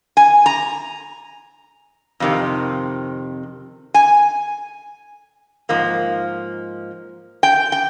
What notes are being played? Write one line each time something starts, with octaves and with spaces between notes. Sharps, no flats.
G#5
A#5
F2 C3 D#3
G#5
G#2 F3 A#3
G5
G5